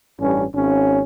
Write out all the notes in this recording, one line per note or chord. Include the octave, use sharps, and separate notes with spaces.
A1 G2 C#4
G#1 C#4